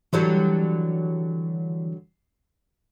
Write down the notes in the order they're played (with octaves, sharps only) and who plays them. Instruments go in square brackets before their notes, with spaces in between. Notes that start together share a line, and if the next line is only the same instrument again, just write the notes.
[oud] D3 F#3 G3 [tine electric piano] E3